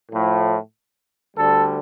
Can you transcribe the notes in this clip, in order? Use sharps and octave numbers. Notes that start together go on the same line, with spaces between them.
A2 F3
D2 D3 G3 A4